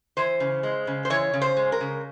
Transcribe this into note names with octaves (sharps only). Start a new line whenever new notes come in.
E3 C5
C#3
G#3
C#3
C5
E3 C#5
C#3
C5
G#3
A#4
C#3